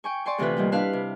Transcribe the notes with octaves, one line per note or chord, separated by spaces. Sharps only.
G5 G#5 C#6
D5 G#5 C6 C#6
D2 C3 E3 F4 B4
D#2 G3 F4
D4 E4 B4 F5
C3